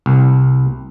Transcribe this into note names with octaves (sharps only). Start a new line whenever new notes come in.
C2